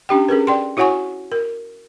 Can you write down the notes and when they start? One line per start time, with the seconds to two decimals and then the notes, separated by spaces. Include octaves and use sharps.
0.09 C#4 D4 G4 G5
0.29 C#4 G#4 A#4 B4
0.47 D5 G5 C6
0.77 E4 F#4 C#5 F#5 G#5 C#6
1.32 A#4